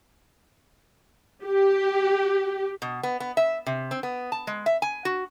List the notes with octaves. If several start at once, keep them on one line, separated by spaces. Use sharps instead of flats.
G4
B2
B3
B3
E5
C3
C4
B3
A5
G#3
E5
G#5
F#4